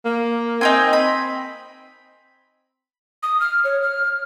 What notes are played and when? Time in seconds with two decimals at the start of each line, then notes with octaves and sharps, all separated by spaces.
0.05 A#3
0.61 C4 D#4 G5 G#5
0.93 B5
3.23 D#6
3.40 F6
3.64 C#5
3.83 F6